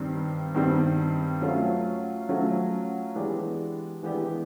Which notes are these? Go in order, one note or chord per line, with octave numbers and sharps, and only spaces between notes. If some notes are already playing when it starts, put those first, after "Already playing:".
Already playing: G2 D#3 G3 C4
G2 D#3 G3 C4
F#3 A3 C#4 F4
F#3 A3 C#4 F4
E3 G#3 B3 D4 G4
E3 G#3 B3 D4 G4